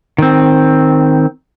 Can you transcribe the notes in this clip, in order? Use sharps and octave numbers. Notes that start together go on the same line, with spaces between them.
D#3 C4